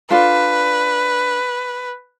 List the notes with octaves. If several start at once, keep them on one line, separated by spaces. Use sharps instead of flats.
D4 F4 A4 B4